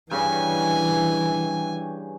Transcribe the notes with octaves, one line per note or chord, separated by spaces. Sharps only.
G2 C#3 E3 G#5